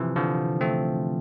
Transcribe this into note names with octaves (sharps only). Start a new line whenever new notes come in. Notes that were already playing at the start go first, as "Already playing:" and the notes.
Already playing: C3 E3 F3
D3 F3
A3 C4